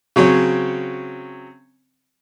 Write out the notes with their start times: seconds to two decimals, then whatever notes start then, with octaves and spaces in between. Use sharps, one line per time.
0.16 C#3 F#3 C4 C#5